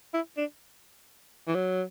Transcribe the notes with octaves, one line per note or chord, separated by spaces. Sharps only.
E4
D4
E3
F#3